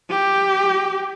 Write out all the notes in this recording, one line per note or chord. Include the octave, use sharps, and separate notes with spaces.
G4